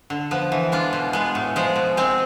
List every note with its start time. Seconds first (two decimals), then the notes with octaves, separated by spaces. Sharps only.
0.10 D3
0.31 F3 B3
0.52 E3
0.72 G#3 D4 F4
0.93 B2
1.13 G#3 B3
1.35 A2
1.56 F3 G#3
1.76 B2
1.97 G#3 C4